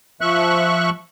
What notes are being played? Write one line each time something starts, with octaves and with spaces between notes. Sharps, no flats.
F3 E5 C#6 F#6